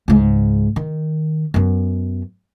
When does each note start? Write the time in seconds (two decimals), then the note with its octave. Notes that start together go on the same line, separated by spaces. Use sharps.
0.08 C#2 G#2
0.76 D#3
1.54 F#2 B3